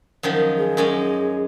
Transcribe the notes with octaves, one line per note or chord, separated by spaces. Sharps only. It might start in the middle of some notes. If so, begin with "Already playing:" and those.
F#2 D#3 F3
G#4
F#2 G#3 C#4